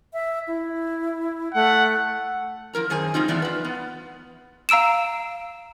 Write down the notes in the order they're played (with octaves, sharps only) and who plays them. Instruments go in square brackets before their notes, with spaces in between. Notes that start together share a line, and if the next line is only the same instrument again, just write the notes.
[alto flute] E5
E4
[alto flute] A3 [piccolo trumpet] F#5
[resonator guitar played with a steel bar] F3 E4 A#4 A#5
F#2 D#3 G#4 C5 G#5
C#3 G3 C4 D#4 F4
A2 E3 B3 D5 E5 F5
F4 B4
B3
[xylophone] F5 A#5 E6 D7 E7